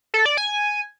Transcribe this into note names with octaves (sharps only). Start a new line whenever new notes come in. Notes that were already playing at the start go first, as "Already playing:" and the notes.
A4
D5
G#5